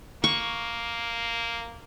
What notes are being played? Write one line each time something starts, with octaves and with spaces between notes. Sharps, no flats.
A#3 C#6